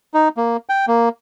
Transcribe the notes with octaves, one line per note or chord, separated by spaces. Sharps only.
D#4
A#3
G5
A#3